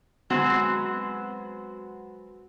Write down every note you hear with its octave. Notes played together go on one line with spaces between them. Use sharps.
F#3 G#3 B3 C4 F#4